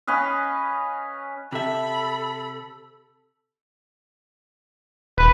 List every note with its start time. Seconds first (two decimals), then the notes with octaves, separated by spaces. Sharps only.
0.07 C#4 B4 D#5 F5
1.52 C3 A4 E5 B5
5.18 D#1 B4